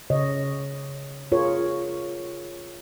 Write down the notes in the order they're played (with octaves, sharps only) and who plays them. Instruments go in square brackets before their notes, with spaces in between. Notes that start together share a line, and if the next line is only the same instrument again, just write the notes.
[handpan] C#3 C#5 D#5
F4 G#4 A#4 C#5